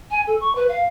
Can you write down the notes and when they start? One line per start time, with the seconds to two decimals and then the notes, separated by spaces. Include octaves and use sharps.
0.11 G#5
0.27 A4
0.41 C#6
0.55 B4
0.69 F5